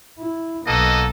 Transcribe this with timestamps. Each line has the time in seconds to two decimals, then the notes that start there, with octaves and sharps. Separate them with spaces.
0.19 E4
0.66 B1 A#3 B3 F#4 A4 D#5